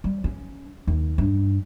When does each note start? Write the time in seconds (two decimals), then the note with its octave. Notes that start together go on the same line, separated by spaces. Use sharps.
0.04 G3
0.24 C#4
0.87 D#2
1.18 G2